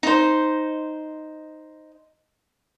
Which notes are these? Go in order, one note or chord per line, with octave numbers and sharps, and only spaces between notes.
D#4 C5